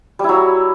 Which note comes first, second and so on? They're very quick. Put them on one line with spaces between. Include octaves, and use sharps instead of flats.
G3 E4 F#3